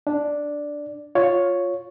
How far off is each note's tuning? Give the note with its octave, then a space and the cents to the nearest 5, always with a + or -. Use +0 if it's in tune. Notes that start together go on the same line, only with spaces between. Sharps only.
D4 +0 D5 +0
F4 +10 C#5 +0